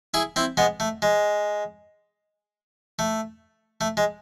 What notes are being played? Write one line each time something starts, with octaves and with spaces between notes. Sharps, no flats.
E4 G#4
C4 E4
G#3 B3
A3
G#3
A3
A3
G#3